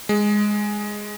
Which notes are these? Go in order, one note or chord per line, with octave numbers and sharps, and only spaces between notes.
G#3